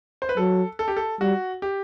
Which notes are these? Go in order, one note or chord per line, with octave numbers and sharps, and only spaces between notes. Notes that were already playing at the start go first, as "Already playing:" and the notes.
C5
B4
F#3 A4
A4
G4
A4
G3 F#4
G4